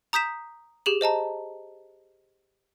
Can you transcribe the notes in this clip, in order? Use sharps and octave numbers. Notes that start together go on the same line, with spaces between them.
A#5 D#6 G6 B6 E7
G4 G#4 F#7
C5 D#5 A5 A#5